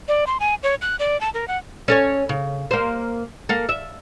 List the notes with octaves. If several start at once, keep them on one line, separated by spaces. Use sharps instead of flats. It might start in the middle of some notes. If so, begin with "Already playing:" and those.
D5
C6
G#5
C#5
F#6
D5
A5
A#4
F#5
C#4 A4 C#5
C#3
A#3 C5
A#3 A4
E5